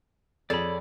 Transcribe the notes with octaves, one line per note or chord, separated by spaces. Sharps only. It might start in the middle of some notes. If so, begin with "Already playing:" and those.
F2 G#4 A4 C#5 D5 B5